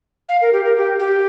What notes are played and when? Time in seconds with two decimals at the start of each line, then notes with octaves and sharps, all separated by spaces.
0.29 F5
0.42 A#4
0.53 G4
0.65 A#4
0.77 G4
0.99 G4